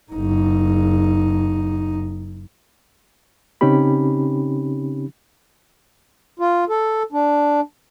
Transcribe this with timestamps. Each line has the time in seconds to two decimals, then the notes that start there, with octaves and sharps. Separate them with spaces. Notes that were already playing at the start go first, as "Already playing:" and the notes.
0.12 F#1 D#4
3.61 C#3 C4 C#4 D#4 G4 B5
6.39 F4
6.69 A4
7.12 D4